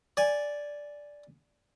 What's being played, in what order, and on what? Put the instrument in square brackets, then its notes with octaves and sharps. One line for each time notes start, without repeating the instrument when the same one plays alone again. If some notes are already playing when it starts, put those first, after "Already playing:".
[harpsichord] D5 G#5